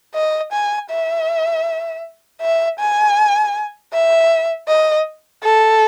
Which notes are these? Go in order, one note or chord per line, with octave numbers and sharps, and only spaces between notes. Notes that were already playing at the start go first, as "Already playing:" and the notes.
D#5
G#5
E5
E5
G#5
E5
D#5
A4